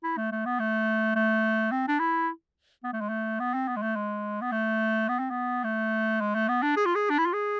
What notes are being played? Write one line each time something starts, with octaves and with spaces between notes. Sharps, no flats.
E4
A3
A3
B3
A3
A3
C4
D4
E4
B3
A3
G#3
A3
B3
C4
B3
G#3
A3
G#3
B3
A3
B3
C4
B3
A3
G#3
A3
B3
D4
G#4
F4
G#4
D4
E4
F4
G#4